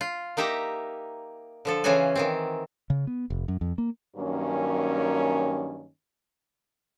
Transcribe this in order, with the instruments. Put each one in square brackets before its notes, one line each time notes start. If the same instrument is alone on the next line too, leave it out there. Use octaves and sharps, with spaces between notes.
[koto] F4
A#3 D#4 G4 E5 A#5
D3 F3 A4
C#3 E3 C#4 F4 F#4 G#5
D#3 E3 C4
[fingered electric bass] C#3
B3
F1
F#2
F2
A#3
[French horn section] G2 D#3 F#3 A#3 C#4